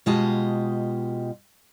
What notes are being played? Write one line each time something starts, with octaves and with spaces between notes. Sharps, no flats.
B2 G#3 F4 G4 D#5 A5